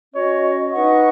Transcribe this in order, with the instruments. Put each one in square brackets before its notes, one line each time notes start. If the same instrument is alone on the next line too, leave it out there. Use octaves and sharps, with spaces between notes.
[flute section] C#4 F#4 D#5 [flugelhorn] C#5
[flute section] D#4 B4 F#5 C#6 [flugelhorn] D#5